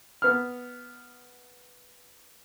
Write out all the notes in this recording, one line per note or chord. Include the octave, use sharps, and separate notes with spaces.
B3 F6